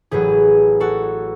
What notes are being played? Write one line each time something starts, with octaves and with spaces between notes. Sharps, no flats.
A1 A2 F#3 G#4 B4
F#4 A4